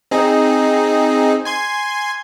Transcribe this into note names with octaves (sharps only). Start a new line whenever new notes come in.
C4 D#4 G#4
G#5 C6 G#6